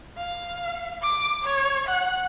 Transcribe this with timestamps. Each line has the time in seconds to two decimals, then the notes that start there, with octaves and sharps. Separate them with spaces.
0.18 F5
1.02 D6
1.44 C#5
1.87 F#5